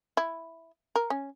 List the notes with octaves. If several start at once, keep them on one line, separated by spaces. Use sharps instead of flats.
E4
A#4
C#4